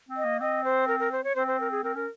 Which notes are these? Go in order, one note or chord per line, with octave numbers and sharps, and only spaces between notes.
C4
D#5
A#3
C4 D#5
C5
A#4
A#4
C5
C#5
C4 C5
C5
A#4
G#4
C4 A#4
C#4 A#4